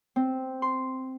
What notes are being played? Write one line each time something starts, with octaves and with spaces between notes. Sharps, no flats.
C4
C6